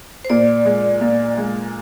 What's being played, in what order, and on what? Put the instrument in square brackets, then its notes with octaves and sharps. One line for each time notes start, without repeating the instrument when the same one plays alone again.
[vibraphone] C5
[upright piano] A#2 [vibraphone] D5
[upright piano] G#3
A#2
G#3